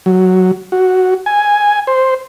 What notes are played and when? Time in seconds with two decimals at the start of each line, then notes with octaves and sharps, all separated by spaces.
0.06 F#3
0.72 F#4
1.26 G#5
1.87 C5